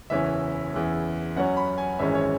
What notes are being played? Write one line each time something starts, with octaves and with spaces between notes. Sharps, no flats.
F#1 E2 E3 C#4 E5
E2 C#3 E3
F#2 F#3 C#4 F#5
B5
G#5
G#1 F#2 E3 G#3 C#4 E5
C#5